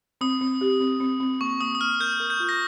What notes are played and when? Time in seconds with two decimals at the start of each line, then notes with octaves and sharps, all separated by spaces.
0.21 C4 D#6
0.41 C4
0.61 G4
0.81 C4
1.00 C4
1.20 C4
1.41 A#3 C#6
1.61 A#3 D#6
1.75 D#6
1.81 A#3 F6
2.00 A#4 G6
2.20 A#4
2.30 G6
2.40 F4
2.49 A#6